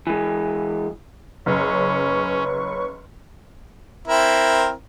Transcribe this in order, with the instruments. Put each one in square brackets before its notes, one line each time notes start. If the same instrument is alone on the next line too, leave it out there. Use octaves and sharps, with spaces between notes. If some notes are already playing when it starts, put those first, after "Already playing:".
[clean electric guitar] E3 G#3
[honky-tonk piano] F#1 [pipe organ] C#4 [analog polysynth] B4 C#5 C#6
[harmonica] C4 E4 A#4